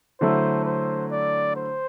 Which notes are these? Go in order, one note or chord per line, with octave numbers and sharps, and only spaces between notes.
D3 F#3 A3 E4 C5
C5
D5
C5